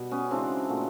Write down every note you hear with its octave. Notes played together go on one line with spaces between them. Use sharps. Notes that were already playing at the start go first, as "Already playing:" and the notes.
Already playing: B2 G3
B3 C#4
C#3 E3 G#3 C4 D4
A#2 F#3 A3